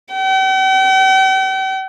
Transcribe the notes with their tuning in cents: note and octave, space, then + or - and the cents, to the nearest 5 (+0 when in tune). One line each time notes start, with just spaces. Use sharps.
G5 -45